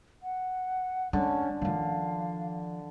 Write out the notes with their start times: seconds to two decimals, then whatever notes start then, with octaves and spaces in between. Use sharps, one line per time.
0.23 F#5
1.13 D3 G#3 C#4
1.62 D#3 F3 F5